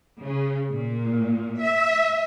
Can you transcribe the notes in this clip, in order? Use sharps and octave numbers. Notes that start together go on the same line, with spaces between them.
C#3
A#2
E5